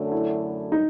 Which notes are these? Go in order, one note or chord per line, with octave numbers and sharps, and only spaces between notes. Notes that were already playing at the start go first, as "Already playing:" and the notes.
Already playing: F#2 D3 F#3 A3 D4
E4
D#4